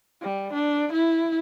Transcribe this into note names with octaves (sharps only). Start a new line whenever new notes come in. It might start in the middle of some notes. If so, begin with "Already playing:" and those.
G3
D4
E4